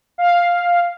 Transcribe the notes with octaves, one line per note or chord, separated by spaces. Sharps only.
F5